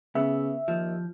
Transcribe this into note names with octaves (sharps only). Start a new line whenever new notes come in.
C#3 B3 E5
D#2 F3